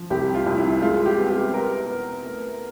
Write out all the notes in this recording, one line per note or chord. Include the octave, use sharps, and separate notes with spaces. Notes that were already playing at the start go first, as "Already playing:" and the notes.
Already playing: F3
C2 G4
F4
C2
E4
G#3 F4
G4
B3
G4
B3 A#4
B3
A3